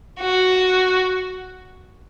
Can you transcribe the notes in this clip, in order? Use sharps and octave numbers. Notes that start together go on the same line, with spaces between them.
F#4